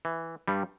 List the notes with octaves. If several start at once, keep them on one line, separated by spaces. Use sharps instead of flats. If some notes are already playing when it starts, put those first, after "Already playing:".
E3
G2 G3